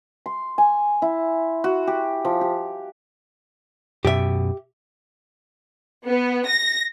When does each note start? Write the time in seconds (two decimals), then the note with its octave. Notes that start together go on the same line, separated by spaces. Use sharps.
0.26 C6
0.58 G#5
1.02 E4
1.64 F#4
1.87 G4
2.25 F3
2.41 G4
4.05 F#2 B2 G4 E5
6.06 B3
6.46 A#6